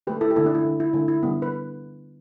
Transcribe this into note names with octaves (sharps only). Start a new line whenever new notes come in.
D3 A3 G4 B4
E4 A4
G4
D3 A3 E4 A4
D4 G4
E4
D3 A3
E4
D3 A3 E4
E4
D3 G3 B3
B4